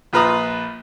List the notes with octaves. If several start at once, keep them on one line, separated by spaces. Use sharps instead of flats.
A#1 F4 B4 A#5 D#6